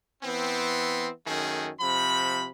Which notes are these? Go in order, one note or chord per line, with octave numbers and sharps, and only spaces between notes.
E3 B3 C4
F#2 D#3 A3 G#4
C3 F3 B5